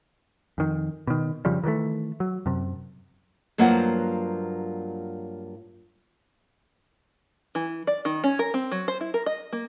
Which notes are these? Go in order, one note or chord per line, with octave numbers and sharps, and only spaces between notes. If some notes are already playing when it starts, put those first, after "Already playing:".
F2 D#3
B2 D#3
F2 C#3 F3 G3
D#3 E3 G3 A3
F#3
F#2 C3
G2 F#3 A#3 F4 C5 F#5
E3
D5
D#3
C#4
A#4
C4
F#3
C5
E4
A#4
D#5
A#3